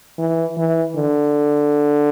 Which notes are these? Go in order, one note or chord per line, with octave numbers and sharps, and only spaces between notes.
E3
E3
D3